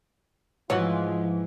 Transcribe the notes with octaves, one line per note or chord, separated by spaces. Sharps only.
G#2 E3 F3 G#3 F4 F#4 C#5